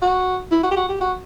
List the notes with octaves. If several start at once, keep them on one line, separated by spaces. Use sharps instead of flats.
F#4
E4
F#4
G4
F#4
G4
F#4